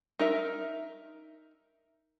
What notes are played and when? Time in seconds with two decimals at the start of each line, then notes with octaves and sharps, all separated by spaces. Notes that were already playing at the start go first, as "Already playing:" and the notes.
0.19 D#4 A#4 E5